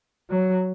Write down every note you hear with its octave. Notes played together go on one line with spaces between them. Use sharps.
F#3